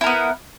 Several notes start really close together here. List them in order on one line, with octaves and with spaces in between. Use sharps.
E4 A#4 B3